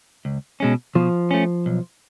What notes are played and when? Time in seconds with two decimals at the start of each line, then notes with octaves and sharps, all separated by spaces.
0.25 C#2
0.60 B2 G#3 C#4
0.95 B2 F3
1.31 A3 C#4
1.66 B1